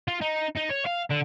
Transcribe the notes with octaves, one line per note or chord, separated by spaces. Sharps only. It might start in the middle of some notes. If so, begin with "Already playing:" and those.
F4
D#4
D#4
C#5
F5
D3